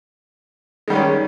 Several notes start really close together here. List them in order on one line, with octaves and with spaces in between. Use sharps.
G#3 G3 D#3 C#4